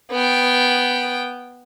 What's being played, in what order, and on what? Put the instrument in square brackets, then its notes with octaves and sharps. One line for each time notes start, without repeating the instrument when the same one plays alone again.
[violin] B3 G5